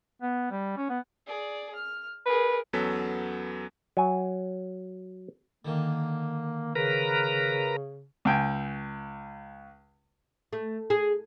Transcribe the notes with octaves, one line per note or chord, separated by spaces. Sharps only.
B3
G3
C#4
B3
G#4 D5
F6
G#4 A#4 B4
E2 F#3 B3 C#4 A4 B6
F#3 G#5
D3 D#3 A#3
C#3 A#4 B4 A#5
C#2 G5 G#5
A3
G#4